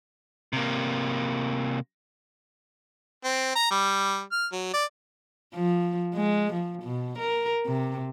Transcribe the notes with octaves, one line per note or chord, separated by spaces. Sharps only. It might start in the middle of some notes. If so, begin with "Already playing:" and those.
C3 A#3
C4
A#5
G3
F6
F#3
D5
F3
G#3
F3
B2
A#4
C3